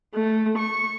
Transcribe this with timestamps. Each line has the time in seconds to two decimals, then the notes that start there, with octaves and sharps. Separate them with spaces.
0.14 A3
0.58 C#6